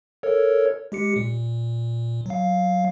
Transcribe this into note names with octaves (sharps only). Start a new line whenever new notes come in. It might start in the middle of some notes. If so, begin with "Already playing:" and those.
A4 A#4 C#5
G#3 G4 C#7
A#2
F#3 F5